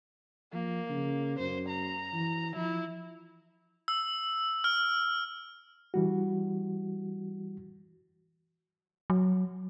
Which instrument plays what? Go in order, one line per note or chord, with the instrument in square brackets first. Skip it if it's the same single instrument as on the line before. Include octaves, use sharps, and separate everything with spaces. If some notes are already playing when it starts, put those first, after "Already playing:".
[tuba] F3 [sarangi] A#3
[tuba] C#3
[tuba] F#2 [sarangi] C5
[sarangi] A#5
[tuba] E3
[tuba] F3 [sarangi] E4
[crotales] E6
F6
[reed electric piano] E3 G3 F#4
[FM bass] F#3